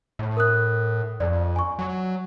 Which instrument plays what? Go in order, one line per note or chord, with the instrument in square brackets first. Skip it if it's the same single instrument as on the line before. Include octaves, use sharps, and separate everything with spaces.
[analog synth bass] A2
[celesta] A#4 D#6 F#6
[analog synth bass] F2 [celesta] D5
[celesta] G#5 C#6
[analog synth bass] F#3